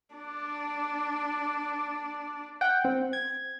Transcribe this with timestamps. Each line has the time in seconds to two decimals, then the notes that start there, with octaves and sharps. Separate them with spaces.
0.15 D4 D5
2.61 F#5 G5
2.85 C4
3.13 G#6